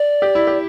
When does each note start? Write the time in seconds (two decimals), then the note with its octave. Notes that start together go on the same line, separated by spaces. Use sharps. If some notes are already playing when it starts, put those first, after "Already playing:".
Already playing: D5
0.22 G4
0.35 E4
0.47 G4